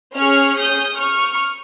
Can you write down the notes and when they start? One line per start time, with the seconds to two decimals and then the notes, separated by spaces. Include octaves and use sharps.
0.16 C#4 G#4 C#6 F6
0.57 D#6 G6
0.98 C#6 F6